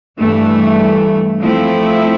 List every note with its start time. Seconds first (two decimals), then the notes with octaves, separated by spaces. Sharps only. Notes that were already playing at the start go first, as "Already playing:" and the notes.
0.19 G2 E3 A3
1.42 F3 A3 C4 E4